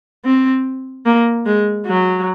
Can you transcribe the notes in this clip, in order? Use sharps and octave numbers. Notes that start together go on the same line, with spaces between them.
C4
A#3
G#3
F#3